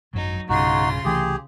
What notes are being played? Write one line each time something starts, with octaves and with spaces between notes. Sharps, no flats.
G#1 F#2 F#3 D#4
B1 G2 C#3 D#4 F4 F#4 C6
C2 E3 A3 G4 G#4